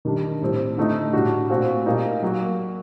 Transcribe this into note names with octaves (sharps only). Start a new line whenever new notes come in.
D#3 G3 D4
A2 G3 C4
D3 A3 D#4
A2 G3 D4 F#4
A#2 A3 C4 F#4
A#2 G3 A#3 D#4
F#3 A#3 F#4